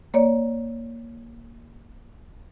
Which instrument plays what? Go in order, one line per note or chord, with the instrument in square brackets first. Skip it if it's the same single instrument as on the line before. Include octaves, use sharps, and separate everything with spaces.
[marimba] A#3 C#5 D5